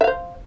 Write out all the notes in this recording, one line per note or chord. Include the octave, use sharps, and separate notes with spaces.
C5 E5 F5